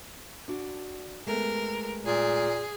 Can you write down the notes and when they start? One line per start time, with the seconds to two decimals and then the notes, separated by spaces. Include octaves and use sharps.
0.48 D4 F#4
1.27 G#3 A3 B3 A#4
2.05 A#2 G#4